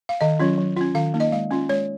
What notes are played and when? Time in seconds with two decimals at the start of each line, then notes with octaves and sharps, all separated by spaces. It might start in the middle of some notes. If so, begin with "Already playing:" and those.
0.09 F5
0.21 D#3 D#5
0.39 F#3 C#4 F4
0.58 F#3
0.76 C#4 F4
0.95 D#3 F5
1.14 A#3 D#4
1.20 D#5
1.32 G#3 F5
1.51 C#4 F4
1.69 G#3 C#5